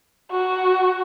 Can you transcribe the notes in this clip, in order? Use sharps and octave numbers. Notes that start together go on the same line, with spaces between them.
F#4